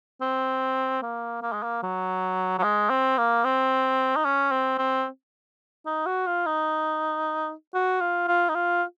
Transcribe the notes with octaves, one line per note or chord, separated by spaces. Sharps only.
C4
A#3
A#3
G#3
A#3
F#3
F#3
G#3
C4
A#3
C4
D#4
C#4
C4
C4
D#4
F#4
F4
D#4
F#4
F4
F4
D#4
F4